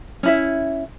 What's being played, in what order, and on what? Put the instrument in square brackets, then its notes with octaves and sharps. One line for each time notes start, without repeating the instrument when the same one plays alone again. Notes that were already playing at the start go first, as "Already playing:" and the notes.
[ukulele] C#4 E4 E5